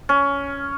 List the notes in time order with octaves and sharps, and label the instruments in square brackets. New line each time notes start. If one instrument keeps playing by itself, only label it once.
[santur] C#4